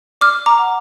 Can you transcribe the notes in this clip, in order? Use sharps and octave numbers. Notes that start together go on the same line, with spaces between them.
D5 D6 F6
A#5 D6
F#5